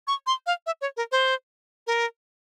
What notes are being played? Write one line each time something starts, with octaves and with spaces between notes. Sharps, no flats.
C#6
C6
F5
E5
C#5
A#4
C5
A#4